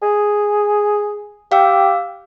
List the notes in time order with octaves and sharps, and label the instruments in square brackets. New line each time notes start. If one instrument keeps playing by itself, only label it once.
[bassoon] G#4
[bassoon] G4 [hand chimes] F5 G5 E6